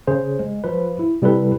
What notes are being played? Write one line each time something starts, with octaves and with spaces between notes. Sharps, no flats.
C#3 G#4 C5
G#3
F3 B4
E4
C3 G3 E4 A4 B4